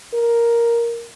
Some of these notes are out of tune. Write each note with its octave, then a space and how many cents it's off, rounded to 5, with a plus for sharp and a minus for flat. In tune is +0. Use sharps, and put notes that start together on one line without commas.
A#4 +5